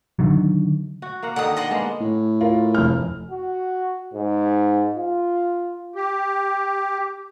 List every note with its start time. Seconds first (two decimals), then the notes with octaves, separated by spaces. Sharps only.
0.19 D3 D#3 F#3
1.02 F#4
1.23 A#3 A#4 F#5
1.36 D3 D#3 F#5 A#5 D#6
1.57 D5 D#5 F#5 C6
1.71 G#3 A#3 B3
2.01 A2
2.41 F4 A#4
2.74 F1 F6
3.31 F#4
4.14 G#2
4.96 F4
5.95 G4